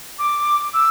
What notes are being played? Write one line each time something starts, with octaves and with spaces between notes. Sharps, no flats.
D6
E6